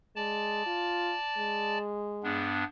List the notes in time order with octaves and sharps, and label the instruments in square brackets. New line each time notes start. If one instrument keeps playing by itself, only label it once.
[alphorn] G#3 [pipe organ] D5 A5
[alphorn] F4
G#3
[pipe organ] G2 B3 D4